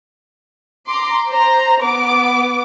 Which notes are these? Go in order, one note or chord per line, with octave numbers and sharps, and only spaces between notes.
A#5 C6 D6
C5 A#5
B3 D6